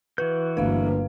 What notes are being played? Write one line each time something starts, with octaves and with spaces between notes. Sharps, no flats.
E3 F#4 B4 G6
G1 D2 A#3 B4 F5